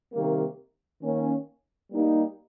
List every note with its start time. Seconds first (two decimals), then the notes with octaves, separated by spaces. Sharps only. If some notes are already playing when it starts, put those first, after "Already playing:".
0.13 C3 D#3 G3 A#3
1.02 D#3 A#3 C#4
1.92 G3 A#3 D#4 G4